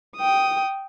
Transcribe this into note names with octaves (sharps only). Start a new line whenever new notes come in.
G5 D#6